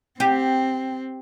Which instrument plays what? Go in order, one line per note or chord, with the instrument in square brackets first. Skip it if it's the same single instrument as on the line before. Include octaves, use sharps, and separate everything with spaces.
[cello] C4 [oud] G4